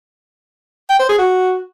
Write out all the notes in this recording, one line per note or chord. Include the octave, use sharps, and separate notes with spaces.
G5
C5
G#4
F#4